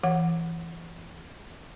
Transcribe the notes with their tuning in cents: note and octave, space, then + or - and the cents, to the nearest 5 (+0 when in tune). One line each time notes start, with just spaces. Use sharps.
E3 +20 F#5 +0